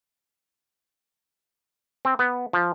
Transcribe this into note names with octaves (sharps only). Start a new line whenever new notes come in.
C4
B3
F3